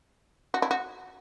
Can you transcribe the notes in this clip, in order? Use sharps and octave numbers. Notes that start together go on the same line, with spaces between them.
F#4
E4
F#4